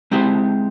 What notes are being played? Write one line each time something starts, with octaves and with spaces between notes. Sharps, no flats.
G#3 C4 E4 G4 C5